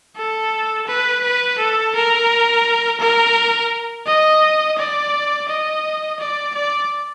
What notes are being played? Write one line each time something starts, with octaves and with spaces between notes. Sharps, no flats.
A4
B4
B4
A4
A#4
A#4
D#5
D5
D#5
D5
D5